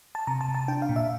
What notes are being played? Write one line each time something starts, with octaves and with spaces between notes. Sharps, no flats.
A5
C3 A#5
A5
C3
A5
D4 G5
F5
A#2
E5